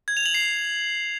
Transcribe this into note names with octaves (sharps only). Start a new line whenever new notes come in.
G#6
F7
F#7
C7